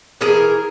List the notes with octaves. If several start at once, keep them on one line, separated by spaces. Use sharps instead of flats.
E3 G#4 A#4